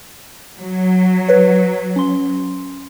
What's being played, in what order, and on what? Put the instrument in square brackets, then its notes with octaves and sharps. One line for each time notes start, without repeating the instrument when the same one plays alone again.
[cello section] F#3
[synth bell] B4 C#5
C#4 C6